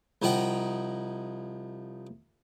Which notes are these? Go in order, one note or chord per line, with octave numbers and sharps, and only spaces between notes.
C2 F3 D#4 F#5 G5 A#5